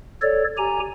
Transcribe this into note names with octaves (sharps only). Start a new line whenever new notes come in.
A4 C#5 D5
G4 G#5 A#5